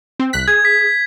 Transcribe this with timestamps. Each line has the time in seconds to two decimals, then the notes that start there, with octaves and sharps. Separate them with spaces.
0.19 C4
0.33 C2 F#6 B6
0.48 G#4 G#6
0.65 B6